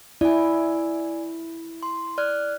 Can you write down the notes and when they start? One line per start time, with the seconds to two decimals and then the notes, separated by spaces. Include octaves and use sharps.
0.21 E4 D5 G#5
1.83 C6
2.18 D5 F6 F#6